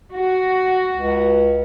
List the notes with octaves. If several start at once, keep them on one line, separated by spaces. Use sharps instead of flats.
F#4
C#2